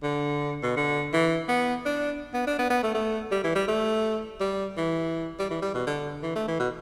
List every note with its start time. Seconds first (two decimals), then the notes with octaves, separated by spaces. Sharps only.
0.03 D3
0.63 B2
0.76 D3
1.13 E3
1.48 B3
1.85 D4
2.34 B3
2.47 D4
2.59 B3
2.70 B3
2.83 A3
2.94 A3
3.31 G3
3.44 E3
3.55 G3
3.68 A3
4.40 G3
4.77 E3
5.39 G3
5.50 E3
5.62 G3
5.74 B2
5.87 D3
6.23 E3
6.35 A3
6.48 E3
6.59 B2